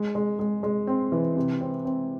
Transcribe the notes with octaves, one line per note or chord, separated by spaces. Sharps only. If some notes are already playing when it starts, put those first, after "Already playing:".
Already playing: G#3
G#3
G#3
G#3
C4
E3
C3
C4
C4